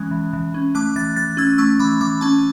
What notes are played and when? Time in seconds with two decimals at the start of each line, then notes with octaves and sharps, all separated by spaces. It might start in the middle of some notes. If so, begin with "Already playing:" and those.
Already playing: E3 G#3 C#4 F#6
0.11 E3
0.33 E3
0.54 C#4
0.75 A3 D6 F#6
0.96 E3 F#6 A6
1.16 E3 F#6 A6
1.37 C#4 E6 G#6
1.58 A3 C#6 E6
1.79 E3 B5 D6
2.01 E3 B5 D6
2.21 C#4 A5 C#6